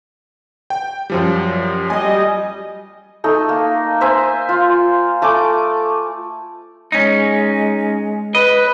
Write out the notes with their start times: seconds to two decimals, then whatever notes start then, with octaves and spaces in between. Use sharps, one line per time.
0.70 G5
1.10 F#2 F3 G3
1.90 G3 D#5 G#5
3.24 A3 D#4 A4
3.49 A#3
4.01 C5 E5 G#5
4.49 F4
5.22 A3 G#5 D6
6.92 G#3 C#4 D#4
8.35 B4 D#5